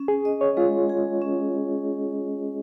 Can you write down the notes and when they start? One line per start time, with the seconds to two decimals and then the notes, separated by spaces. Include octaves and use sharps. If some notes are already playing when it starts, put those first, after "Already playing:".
Already playing: C#4
0.08 G#4
0.25 D#5
0.41 C#5
0.57 G#3 F4
0.89 G#4
1.22 C#4